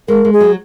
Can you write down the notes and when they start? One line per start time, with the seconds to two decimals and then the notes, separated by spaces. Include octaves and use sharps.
0.08 G#3 A#4
0.25 G#3
0.33 G#4
0.40 F#3